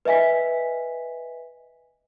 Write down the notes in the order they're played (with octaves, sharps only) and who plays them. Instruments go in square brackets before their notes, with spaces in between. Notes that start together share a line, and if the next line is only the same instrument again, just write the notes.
[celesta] B4 D#5 E5 G#5 B6